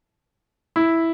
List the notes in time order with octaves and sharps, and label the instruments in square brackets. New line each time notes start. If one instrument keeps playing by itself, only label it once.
[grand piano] E4